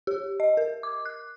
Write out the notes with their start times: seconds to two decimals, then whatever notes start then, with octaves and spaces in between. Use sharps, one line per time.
0.07 G4
0.40 D#5
0.57 A#4
0.83 D6
1.05 F#6